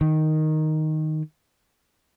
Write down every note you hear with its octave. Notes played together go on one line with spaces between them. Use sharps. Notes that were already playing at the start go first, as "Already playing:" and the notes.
D#3